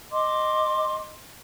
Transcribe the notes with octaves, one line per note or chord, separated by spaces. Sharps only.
D#5 C6 D6